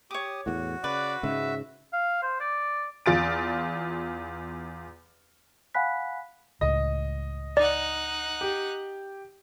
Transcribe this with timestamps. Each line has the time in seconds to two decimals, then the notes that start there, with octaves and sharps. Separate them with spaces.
0.11 G4 C#5 D6 D#6
0.46 E2 A2 F#4
0.84 C#3 B4 D5
1.23 G#2 C#3 G#3 E5
1.93 F5
2.23 C5
2.40 D5
3.06 E2 F4 A6 D7
5.75 F5 F#5 G#5 B5 F#6 B6
6.61 C#2 A2 D#5
7.57 D#4 D5 F#5
8.41 G4